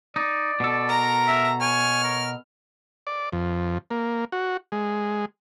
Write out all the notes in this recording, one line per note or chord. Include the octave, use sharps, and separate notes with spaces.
D#4 D5
B2 A4
A#4 A#5
E5
C#5 G#5 F6
A#4
D5
F2
A#3
F#4
G#3